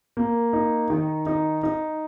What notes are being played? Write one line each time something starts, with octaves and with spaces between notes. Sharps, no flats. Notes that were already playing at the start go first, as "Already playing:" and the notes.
A#3
D#4
D#3
D#4
D#4